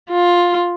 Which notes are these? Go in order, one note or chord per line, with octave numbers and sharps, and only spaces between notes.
F4